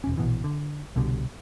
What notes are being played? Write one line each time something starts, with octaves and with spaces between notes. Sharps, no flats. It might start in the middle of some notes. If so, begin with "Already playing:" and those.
E1 C#4
A#1 B2 E3
D3
C2 B2 D3 G3